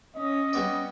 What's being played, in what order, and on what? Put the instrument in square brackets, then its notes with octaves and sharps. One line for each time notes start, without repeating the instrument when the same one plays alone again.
[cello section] C#4 [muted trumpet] D#5
[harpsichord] G3 B3 D5